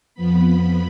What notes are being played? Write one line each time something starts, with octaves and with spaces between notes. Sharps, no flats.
F2 F3 B3 B5